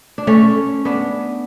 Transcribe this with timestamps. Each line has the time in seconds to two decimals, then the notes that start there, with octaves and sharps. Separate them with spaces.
0.18 D4
0.27 A3 C#4
0.85 B3 D4